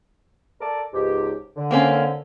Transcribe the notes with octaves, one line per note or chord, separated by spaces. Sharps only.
A4 A#4 D5
C#2 G#2 G4
D3
A#3 C4 C#4